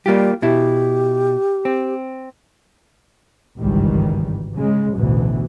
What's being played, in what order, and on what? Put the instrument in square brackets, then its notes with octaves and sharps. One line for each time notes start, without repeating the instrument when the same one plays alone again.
[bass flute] G3 [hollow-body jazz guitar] A#3 F4 G4
[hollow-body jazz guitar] B2 E4 [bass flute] G4
[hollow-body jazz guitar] C4
[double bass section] G#1 C#2 G2 D#3 E3 G3
C#3 G#3
A1 D2 B2 E3